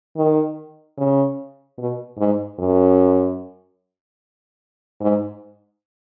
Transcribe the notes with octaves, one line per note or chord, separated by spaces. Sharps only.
D#3
C#3
B2
G#2
F#2
G#2